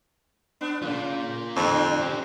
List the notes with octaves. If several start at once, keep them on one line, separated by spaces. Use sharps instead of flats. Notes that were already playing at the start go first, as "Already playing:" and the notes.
B3 D4
C#3 A#3 F4
F2 D3 G3 C4
C#4 G4